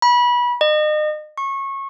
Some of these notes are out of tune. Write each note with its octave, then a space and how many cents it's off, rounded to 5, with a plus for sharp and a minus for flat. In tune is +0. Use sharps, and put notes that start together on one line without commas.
B5 -25
D#5 -35
C#6 -25